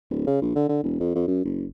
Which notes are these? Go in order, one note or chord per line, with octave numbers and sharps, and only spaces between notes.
D1
C#3
A#1
D3
D3
E1
F2
F2
F#2
F#1